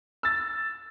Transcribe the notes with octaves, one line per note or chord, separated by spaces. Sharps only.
E6 A6